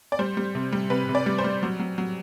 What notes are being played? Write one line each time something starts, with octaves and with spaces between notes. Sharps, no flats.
D5
G3 C5
G3
C3
G3
C3 B4
C3
D5
G3
C5
G3
F#3
F#3
F#3